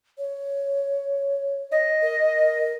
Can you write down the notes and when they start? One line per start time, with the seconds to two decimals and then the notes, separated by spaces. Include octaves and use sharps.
0.18 C#5
1.72 D#5
2.02 A#4